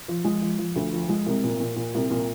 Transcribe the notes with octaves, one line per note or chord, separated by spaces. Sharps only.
F3
G#3
F3
F3
D2
F3
G#3
C2
A#2
A#2
A#2
C2
A#2